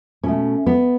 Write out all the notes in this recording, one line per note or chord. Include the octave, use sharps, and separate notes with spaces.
B2 A3 C#4
B3